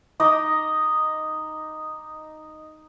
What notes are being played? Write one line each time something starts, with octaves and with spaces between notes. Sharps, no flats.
D#4 D#5 D6